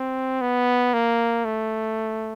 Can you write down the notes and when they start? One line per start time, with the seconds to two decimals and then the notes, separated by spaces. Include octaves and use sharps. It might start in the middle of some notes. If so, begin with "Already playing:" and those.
Already playing: C4
0.41 B3
0.94 A#3
1.45 A3